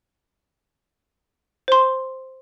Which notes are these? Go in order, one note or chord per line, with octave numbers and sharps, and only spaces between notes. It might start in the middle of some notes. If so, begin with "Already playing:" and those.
C5 C6